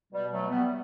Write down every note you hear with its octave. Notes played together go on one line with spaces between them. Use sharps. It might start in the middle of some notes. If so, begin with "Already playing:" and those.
B2 G3
F#3 A3
G3 B3